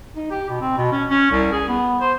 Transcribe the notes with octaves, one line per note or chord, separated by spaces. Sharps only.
D#4
G4
B2
C4
B2
C#4
C#4
C2
G#4
B3
C5